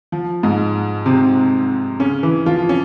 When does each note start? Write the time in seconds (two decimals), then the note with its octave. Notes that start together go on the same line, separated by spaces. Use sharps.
0.12 F3
0.43 G#2 G#3
1.06 C3 C4
2.00 C#3 C#4
2.23 E3 E4
2.46 F3 F4
2.69 C#4